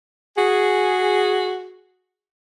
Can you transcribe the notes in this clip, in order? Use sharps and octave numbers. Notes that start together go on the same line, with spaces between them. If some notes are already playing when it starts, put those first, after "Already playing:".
F#4 G#4